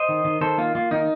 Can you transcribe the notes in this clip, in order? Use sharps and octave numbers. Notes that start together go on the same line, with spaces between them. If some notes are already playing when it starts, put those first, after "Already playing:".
Already playing: C5 D#5
D#3
D#3
D#3 A4 C5
A#3 F4
A#3 F4
D#3 D#4